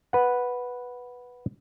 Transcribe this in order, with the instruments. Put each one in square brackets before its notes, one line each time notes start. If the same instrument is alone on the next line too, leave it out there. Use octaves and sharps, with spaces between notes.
[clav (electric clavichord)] B4 F#5